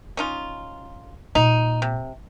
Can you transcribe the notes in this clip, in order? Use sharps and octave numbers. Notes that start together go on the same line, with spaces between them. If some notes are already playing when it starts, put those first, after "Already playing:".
C#4 D#4 F4
A#2 D#4
C3